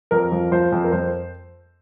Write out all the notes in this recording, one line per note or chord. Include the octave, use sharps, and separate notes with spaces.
F2 A#4
F3
F3 C5
F2
A#4
F2 C5